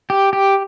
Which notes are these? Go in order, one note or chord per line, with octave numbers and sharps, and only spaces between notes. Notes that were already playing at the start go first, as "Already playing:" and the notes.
G4
G4